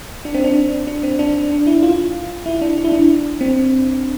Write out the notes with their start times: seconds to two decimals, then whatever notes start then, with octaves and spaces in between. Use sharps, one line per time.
0.25 D4
0.34 C4
0.44 D4
0.87 D4
1.03 C4
1.19 D4
1.51 D4
1.67 E4
1.83 F4
2.46 E4
2.61 D4
2.78 D4
2.84 E4
2.92 D4
3.41 C4